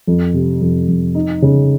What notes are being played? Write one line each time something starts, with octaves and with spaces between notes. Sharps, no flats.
F2
C3
F2
F2
D#4
C#3